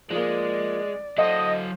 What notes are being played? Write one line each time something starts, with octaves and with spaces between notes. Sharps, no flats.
F3 G#3 A#3 D5
F#3 A4 C5 D#5 F5 F#5